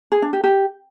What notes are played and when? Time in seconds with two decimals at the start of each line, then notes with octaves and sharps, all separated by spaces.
0.12 G#4
0.22 D4
0.33 G4
0.44 G4